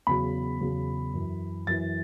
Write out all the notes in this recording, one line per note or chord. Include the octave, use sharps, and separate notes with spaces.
E2 C#3 F#3 B5
E2 C#3 F#3
F#2 E3
F#2 E3 A6